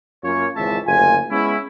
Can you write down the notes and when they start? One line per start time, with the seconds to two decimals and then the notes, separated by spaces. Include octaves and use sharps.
0.24 F#2 A#3 C#4 F4 C#5
0.55 G#1 C#2 G#2 E3 E5 A5
0.86 F#1 D2 F4 G#5
1.31 G#3 B3 C#4 E4